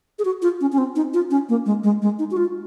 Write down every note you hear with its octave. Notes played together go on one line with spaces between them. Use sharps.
G#4
F#4
F4
C#4
C#4
C4
D#4
F4
C#4
A#3
G#3
G#3
G#3
D#4
F#4
F4